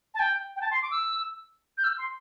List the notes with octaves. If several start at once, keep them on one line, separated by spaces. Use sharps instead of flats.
A5
G5
G5
A5
C6
D6
E6
G6
E6
C6